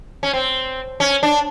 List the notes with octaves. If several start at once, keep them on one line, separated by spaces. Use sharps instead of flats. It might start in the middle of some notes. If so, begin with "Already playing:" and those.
C#4
C4
C#4
D4